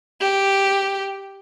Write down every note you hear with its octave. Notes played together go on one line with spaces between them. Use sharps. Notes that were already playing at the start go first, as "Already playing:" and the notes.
G4